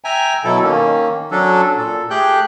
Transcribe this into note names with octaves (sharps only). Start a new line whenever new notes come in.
E5 G5 G#5 A#5
B2 F#3 E4 A4
D#3 A#3 C#4
F#3 C#4 D4 A4
A#2 A4
A3 G4 G#4 G5 F#6 G6